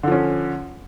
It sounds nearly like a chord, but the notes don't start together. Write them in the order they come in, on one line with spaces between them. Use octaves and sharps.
D3 F3 C#4